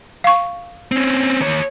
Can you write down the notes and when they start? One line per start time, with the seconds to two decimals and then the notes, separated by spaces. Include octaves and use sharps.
0.24 F5 C#6
0.92 C4 C#4
1.41 D#2 C#5